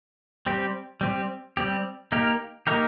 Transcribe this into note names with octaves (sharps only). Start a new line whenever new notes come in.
G3 C4 G4
G3 C4 G4
G3 C4 G4
A#3 D#4 G4 A#4
A#3 D#4 G4 A#4